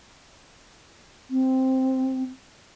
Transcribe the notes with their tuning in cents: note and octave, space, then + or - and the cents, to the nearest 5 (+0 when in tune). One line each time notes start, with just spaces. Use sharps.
C4 +0